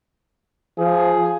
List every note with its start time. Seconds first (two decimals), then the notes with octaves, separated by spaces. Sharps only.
0.78 F3 G#4